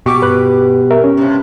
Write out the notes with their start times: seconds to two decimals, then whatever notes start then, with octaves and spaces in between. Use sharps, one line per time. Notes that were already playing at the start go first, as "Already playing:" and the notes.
0.06 B2 G4 C#6 D6
0.22 G2 B4 F#6
0.91 A#4 E5
1.04 C#4
1.17 G2 C3